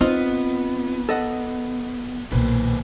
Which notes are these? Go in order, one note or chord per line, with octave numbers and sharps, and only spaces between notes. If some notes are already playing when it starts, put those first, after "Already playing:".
B3 C4 D#4 F4 D#5
A4 D#5 F#5
B1 A#2 D#3 B4 C5